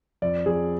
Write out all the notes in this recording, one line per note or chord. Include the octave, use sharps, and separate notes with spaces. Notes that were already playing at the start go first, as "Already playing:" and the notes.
F2 D5
F2 G#4